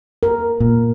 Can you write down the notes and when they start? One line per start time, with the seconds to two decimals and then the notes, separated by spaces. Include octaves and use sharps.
0.23 A#4
0.60 A#2